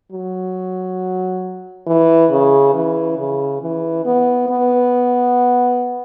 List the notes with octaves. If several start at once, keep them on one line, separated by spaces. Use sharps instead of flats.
F#3
E3
C#3
E3
C#3
E3
B3
B3